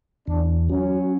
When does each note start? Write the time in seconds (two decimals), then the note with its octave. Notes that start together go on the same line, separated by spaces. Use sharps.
0.27 E2 D4
0.69 F#3 C#4